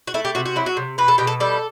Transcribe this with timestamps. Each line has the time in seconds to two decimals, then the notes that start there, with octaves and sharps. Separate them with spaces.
0.07 F#4
0.14 A3 E4
0.25 G4
0.35 C3 F#4
0.46 F#4
0.56 F#3 E4
0.66 F#4
0.77 C3
0.98 B2 B4
1.08 A4
1.18 B2 G4
1.27 A4
1.40 G3 A4